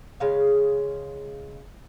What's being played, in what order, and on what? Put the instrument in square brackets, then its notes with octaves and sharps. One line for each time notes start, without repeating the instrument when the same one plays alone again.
[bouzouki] C#3 G#3 F5